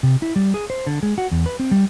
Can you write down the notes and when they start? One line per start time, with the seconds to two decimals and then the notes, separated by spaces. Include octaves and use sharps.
0.03 C3
0.22 E4
0.36 G3
0.54 G#4
0.70 C5
0.87 D3
1.03 G#3
1.18 F#4
1.32 E2
1.46 B4
1.60 C4
1.71 G3